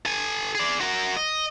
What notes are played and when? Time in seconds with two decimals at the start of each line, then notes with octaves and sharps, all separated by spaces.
0.05 A4 G#5
0.55 G#4 D5
0.81 F#4 A#4
1.17 D#5